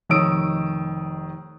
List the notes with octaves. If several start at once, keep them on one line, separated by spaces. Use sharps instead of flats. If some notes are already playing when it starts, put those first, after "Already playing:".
F1 D#3 C#5 D#6 E6 D7